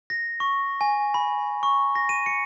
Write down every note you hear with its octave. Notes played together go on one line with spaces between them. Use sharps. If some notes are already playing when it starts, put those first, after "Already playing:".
A#6
C#6
G#5
B5
C#6
A#6
D#7
C#7